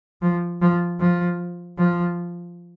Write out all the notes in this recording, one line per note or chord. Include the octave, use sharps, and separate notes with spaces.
F3
F3
F3
F3